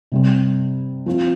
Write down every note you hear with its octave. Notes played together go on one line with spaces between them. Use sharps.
C3 G3 C4
F3 C4 F4